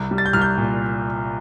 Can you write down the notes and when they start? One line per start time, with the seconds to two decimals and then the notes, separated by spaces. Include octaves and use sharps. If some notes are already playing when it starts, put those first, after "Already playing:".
Already playing: C2
0.11 G3
0.18 A6
0.26 G6
0.33 C2 F6
0.41 G6
0.58 A#2